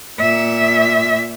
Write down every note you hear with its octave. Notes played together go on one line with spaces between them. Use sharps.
A#2 E5